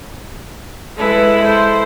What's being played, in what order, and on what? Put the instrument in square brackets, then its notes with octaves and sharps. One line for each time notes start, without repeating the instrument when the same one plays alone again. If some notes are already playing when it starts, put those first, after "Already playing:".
[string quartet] G#3 E4 [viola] A4 B4
[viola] A4 C5